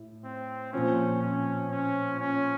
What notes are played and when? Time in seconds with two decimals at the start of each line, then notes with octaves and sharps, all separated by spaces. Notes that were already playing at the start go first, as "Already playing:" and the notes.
Already playing: A2
0.24 C4
0.73 A#2 F3 C4 C#4
1.22 C#4
1.71 C#4
2.20 C#4